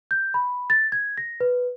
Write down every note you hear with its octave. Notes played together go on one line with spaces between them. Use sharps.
G6
B5
A6
G#6
A#6
B4